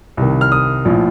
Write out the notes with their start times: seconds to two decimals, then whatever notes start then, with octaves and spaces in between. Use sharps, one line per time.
0.17 C2 C3 D#3
0.41 F6
0.52 D#6
0.85 A#1 A2 F3